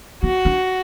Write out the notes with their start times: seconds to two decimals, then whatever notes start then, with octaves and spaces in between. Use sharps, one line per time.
0.23 B3 F#4
0.45 D4